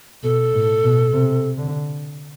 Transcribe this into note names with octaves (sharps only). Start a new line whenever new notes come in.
B2 A4
A2
B2
C3
D3